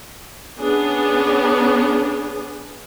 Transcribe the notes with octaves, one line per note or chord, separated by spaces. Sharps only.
B3 C#4 D4 G#4